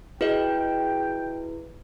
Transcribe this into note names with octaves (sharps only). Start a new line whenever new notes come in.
E4 F#4 G#4 B4 D#5 G5